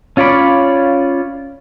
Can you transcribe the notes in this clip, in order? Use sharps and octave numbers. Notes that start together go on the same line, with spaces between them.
C#4 F4 C#5 D5 B5